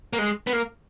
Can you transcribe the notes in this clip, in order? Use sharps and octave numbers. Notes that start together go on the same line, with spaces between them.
A#3
G#3
B3
A#3